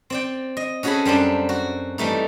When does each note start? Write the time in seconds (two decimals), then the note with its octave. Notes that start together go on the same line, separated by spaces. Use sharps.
0.10 C4 D5 G5
0.57 D#5
0.83 C#4 F#4 G#4 A4 G#5 B5
1.05 F#2 G3 C4 D4
1.49 F#4
1.98 E3 G3 A3 D#4